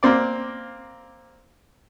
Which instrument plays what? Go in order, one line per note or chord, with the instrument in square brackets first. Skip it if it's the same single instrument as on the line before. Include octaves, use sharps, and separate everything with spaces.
[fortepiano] A#3 C4 D5